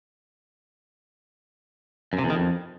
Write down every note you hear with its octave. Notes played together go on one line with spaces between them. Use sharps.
F#2
C3
E2
D#3
F2